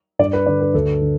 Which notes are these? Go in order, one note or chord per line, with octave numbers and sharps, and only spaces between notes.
G2 D5
B4
D3 D5
B4
D2 A4
D3